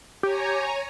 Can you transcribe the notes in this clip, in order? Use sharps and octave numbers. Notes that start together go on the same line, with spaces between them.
G4 C#5 G#5 A#5